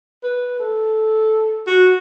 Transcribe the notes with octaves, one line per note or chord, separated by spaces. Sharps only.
B4
A4
F#4